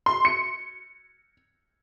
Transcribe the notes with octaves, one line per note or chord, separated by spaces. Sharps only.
C6
C#7